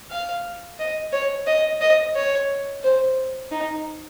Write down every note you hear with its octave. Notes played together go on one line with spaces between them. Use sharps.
F5
D#5
C#5
D#5
D#5
C#5
C5
D#4